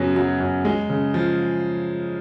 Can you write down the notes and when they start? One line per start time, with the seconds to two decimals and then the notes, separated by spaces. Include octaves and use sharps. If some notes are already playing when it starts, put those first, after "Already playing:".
Already playing: F#2 C#3 F#3 B3
0.16 F#3
0.40 F#2
0.65 G#3
0.90 C#3
1.14 F3